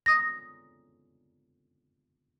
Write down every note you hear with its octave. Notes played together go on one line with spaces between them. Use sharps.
D#6 A#6